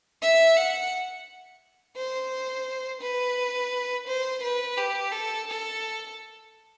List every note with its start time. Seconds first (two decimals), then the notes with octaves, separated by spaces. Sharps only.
0.22 E5
0.57 F#5
1.97 C5
3.02 B4
4.08 C5
4.43 B4
4.78 G4
5.12 A4
5.48 A4